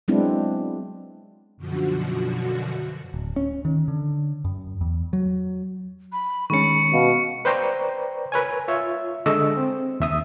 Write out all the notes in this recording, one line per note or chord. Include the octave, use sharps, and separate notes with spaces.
F#3 G#3 B3 C4 D4 E4
F#2 B2 D3 F3 F#4
D1
C#4
D#3
D3
F#2
E2
F#3
B5
D#3 G#3 C#4 B5 C#6 C#7
B2 F5
B4 C5 D5 G5 A#5 C#6
A#4 B4 C#5 G#5
F4 C#5 E5
D3 G#3 A4 D#5 C#6 E6
C4
D#2 E5 D#6